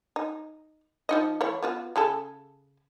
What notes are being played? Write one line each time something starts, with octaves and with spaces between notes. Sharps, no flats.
D#4
F3 D#4 D#5
E3 A3 C#5
B3 F4 F#4
C#3 G#4 A4